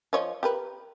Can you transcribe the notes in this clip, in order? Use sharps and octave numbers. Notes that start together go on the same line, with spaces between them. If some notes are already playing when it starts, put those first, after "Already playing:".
F3 C#5 D#5
G4 A#4 B4